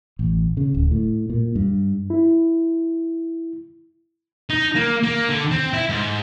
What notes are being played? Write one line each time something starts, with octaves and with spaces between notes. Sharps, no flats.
A1
C#3
D1
A2
A#2
G2
E4
D#4
A#3
A#3
D3
C4
E4
G#2